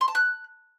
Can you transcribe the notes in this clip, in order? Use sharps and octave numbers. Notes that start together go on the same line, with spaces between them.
C6
A5
F#6